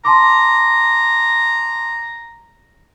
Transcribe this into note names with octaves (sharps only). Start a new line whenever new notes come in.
A5 A#5 C6 D6